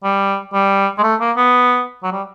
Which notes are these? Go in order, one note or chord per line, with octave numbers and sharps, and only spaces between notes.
G3
G3
G#3
A3
A#3
B3
F#3
G3